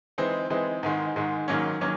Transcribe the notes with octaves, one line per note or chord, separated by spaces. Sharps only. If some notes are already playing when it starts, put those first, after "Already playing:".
E3 G#3 C4 D#4
E3 G#3 C4 D#4
G#2 D#3 G#3
G#2 D#3 G#3
G#2 D#3 F#3 A#3 C#4
D#3 F#3 A#3 C#4